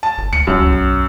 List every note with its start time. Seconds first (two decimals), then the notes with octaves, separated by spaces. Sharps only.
0.03 A5
0.18 G1
0.33 D2 C#7
0.47 D#1 F#2
0.59 D2
0.72 B1